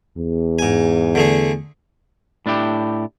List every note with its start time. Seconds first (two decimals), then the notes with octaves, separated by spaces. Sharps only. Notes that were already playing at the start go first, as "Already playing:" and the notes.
0.18 E2
0.59 G#2 G#5
1.15 D3 A3 G#4
2.46 A2 D4 E4 G4